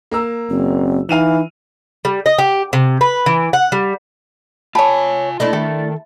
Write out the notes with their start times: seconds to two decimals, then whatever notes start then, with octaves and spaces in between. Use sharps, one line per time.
0.11 A#3 A#5 E6
0.50 F#1 C4
1.09 E3 D#4 F5 D#7 F7
2.05 G3
2.26 D#5
2.38 G4
2.73 C3
3.01 B4
3.26 E3
3.53 F#5
3.72 G3
4.75 F4 C#5 G#5 A5 B5
5.40 A3 D4 E4 D#5 B5 C6
5.53 D#3 A4 E5